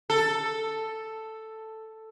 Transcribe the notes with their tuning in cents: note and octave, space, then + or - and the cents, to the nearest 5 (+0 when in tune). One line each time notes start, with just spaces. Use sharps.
A4 +5